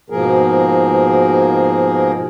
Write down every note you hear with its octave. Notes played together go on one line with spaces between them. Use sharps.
G#2 B2 F3 A#3 G#4 A#4